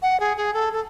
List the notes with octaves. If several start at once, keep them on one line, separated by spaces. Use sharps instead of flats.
F#5
G#4
G#4
A4
A4